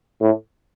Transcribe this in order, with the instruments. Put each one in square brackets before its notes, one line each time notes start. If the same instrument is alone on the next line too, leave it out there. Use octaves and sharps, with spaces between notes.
[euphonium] A2